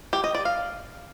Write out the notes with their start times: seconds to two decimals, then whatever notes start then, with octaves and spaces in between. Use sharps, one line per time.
0.13 G4
0.24 D#5
0.35 D5
0.45 F5